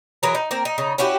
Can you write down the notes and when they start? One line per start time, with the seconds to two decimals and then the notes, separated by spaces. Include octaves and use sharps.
0.23 E3 F#3 G#4 A#4
0.35 D#4
0.51 A#3 C4 A#4
0.65 D#4
0.78 C#3 D#4
0.98 C#4 E4 F#4 G4